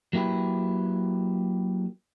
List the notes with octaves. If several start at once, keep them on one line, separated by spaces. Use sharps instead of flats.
F#3 A#3 E4 G4 B4